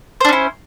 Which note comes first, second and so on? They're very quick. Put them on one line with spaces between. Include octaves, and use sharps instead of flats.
C5 D4 C#4 E4